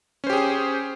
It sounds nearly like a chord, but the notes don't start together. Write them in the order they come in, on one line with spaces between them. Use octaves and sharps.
C#4 C5 G4 G#4